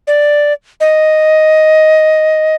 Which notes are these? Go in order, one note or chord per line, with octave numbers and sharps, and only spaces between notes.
D5
D#5